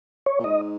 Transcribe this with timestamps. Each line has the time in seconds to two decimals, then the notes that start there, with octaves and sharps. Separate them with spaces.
0.26 C#5
0.40 A#2
0.44 G#2 D#5